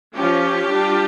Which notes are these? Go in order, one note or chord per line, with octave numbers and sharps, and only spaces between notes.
F3 C#4 F4 G4
G3 D4 F4